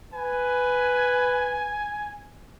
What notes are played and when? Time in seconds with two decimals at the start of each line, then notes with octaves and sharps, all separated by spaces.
0.14 B4 G#5